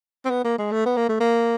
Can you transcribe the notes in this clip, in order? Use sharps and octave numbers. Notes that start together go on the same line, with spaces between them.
C4
B3
A#3
G#3
A3
B3
A#3
A3
A#3